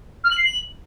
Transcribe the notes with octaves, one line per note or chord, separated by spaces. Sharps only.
F6
F#7
C7
F#7